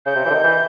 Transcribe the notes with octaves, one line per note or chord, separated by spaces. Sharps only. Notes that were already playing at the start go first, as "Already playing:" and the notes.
C#3 G6
C3
E3
D3
D#3
E3